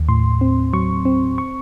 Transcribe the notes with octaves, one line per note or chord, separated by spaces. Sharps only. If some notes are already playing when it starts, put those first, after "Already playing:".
Already playing: D#2
A2 C6
C4
F#3 C#6
C4
C#6